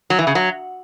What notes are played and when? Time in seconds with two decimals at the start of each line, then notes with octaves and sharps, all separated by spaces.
0.10 F#3
0.19 E3
0.27 C#3
0.35 F#3